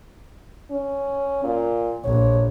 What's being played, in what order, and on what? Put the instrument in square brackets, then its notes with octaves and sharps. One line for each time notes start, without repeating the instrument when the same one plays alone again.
[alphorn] C#4
A#2
[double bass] A#1 [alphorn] C#5